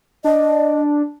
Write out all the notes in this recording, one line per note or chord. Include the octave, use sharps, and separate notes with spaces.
D4 D#5